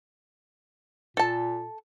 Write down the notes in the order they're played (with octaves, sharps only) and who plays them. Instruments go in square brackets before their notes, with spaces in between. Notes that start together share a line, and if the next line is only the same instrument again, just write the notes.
[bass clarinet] A#2 [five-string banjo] A4 A5